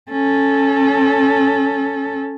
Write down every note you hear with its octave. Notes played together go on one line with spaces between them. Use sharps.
C#4 A4